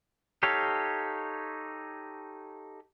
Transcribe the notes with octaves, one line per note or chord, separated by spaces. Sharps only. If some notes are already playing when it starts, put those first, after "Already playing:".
D#4 G4 A4 C#5 F5